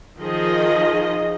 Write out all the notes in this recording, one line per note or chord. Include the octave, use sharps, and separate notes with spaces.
D#3 F3 G#4 D#5